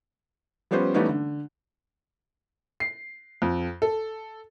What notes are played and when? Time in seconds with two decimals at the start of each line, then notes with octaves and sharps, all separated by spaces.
0.71 F3 G3 B3 C#4 C5
0.94 E3 G3 A3 B3 C#4 D#4
1.09 D3
2.80 C7
3.42 F2
3.82 A4